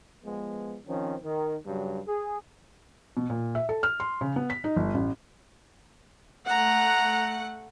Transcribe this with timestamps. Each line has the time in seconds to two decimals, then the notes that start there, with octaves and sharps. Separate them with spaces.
0.24 F3 G#3 B3
0.87 D#3 F3 C4 C#4
1.24 D#3
1.66 G2 C#3 F#3 G3
2.07 G#4
3.17 B2
3.30 A#2
3.55 E5
3.69 A4
3.83 F6
4.00 C6
4.21 C#3
4.36 B3
4.50 B6
4.64 D#4
4.76 G1
4.94 A1
6.49 A3 F#5 A#5